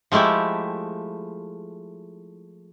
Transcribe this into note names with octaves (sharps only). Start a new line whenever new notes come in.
F3 G#3 A3 E4 G4